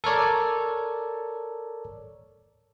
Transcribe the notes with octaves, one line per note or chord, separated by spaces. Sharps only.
A4 A#4 C#5 D5